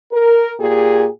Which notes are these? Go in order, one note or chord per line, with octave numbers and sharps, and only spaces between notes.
A#4
A#2 G4 G#4